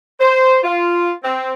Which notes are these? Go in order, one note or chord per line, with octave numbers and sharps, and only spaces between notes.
C5
F4
C4